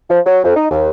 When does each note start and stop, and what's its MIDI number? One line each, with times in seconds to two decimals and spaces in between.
0.10 0.20 53
0.26 0.40 54
0.44 0.56 41
0.56 0.66 63
0.71 0.91 39